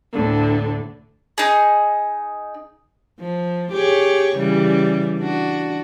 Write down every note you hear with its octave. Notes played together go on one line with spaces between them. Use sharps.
D2 A2 D3
D#4 G#4
F3
G4 G#4 C#5
C#3 E3 G3
D4 F#4